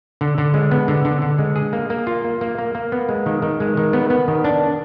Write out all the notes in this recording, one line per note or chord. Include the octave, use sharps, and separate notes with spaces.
D3
D3
G#3
B3
D3
D3
D3
G#3
G#4
A#3
A#3
F4
A#3
A#3
A#3
A#3
B3
G#3
D#3
D#3
G#3
D#3
B3
B3
D#3
D4